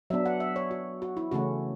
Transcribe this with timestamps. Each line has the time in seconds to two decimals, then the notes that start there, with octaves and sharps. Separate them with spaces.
0.10 F#3 B3 D4 E5
0.26 F#5
0.40 E5
0.56 C#5
0.71 F#4
1.02 F#4
1.17 E4
1.32 C#3 E3 A3 C#4 F#4